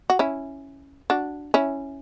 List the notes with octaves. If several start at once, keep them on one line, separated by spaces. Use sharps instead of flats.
F#4
C#4 E4
D4 F#4
C#4 E4